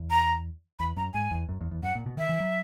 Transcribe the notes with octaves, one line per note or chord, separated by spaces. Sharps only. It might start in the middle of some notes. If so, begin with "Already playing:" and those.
Already playing: E2
A#5
E2 B5
F#2 A#5
G#2 G#5
E2
F#2
E2
E2
F#2 F#5
A#2
B2
D#3 E5
E3
F#3